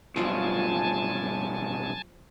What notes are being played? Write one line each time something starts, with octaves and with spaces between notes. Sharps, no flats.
B1 G2 F3 F4 F#4 G#5 A5